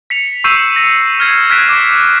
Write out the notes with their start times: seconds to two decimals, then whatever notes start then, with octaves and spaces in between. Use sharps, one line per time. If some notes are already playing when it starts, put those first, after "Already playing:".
0.10 B6 C#7 F7
0.44 C#6 E6 G6 C7 D#7 E7
0.76 A#6 C#7
1.20 F6 G#6 C7
1.50 F6 F#6 G#6 B6 D7 E7
1.69 D6 D7